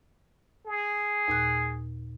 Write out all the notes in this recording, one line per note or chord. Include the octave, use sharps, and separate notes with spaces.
G#4
D#2 A#2 F#6